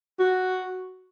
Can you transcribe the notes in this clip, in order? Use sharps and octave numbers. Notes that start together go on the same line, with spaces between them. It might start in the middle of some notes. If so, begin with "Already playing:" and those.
F#4